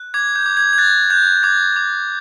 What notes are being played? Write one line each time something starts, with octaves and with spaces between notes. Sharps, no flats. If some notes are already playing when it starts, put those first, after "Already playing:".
Already playing: F#6
D6 G#6
G6
D6
G#6
G#6
F#6 A6
F#6 G6
D6 G#6
D6